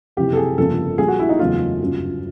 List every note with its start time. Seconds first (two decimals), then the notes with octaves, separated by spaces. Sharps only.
0.17 F#1 F2 C3 E3 G4
0.33 A4
0.37 G#4
0.58 G1 F2 C#3 F3 A#3 A4
0.98 A#1 A#2 G3 A#3 G#4
1.08 F#4
1.19 E4
1.29 D#4
1.39 F#1 E2 C#3 F#3 A3 F4
1.80 G1 F#2 C#3 F#3